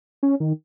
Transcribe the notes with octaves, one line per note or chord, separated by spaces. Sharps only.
C#4
D#3